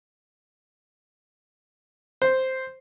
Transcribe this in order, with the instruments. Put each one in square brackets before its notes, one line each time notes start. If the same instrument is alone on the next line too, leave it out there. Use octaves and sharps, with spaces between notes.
[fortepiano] C5